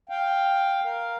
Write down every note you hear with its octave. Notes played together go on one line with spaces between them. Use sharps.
F5 G5
A#4 F5